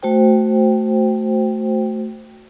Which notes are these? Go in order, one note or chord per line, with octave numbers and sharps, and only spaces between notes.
A3 F#4 C5 G5